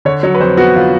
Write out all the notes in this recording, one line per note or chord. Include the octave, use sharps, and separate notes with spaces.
D3 C#5
F#3 C#5
B4
F2 C5
B3 F#4
D3 F4